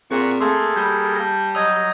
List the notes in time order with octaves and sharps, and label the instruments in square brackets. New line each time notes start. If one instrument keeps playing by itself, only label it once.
[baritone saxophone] A#2 [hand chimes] C4 G#4 [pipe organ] F#5 C#6
[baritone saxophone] A3 [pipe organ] A#3 G#4 A4 [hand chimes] C6
[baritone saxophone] G3 [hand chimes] B5 G6
[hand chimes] A5 G6 A#6
[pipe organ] F#3 A#5 D#6 [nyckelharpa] D#5 [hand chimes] E6 G6 G#6